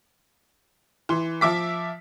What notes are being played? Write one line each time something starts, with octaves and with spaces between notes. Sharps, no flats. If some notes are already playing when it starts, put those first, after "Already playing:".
E3 C6
F3 E5 D6 B6